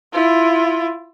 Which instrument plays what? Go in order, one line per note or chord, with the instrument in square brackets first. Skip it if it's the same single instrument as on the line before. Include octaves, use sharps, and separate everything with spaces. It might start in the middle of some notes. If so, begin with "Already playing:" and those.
[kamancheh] E4 F4